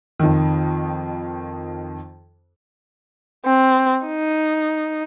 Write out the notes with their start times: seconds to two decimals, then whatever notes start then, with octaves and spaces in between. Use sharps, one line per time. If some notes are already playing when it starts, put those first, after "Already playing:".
0.20 F2 D#3
3.45 C4
4.06 D#4